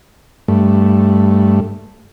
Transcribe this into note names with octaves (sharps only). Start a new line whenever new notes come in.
G2 A3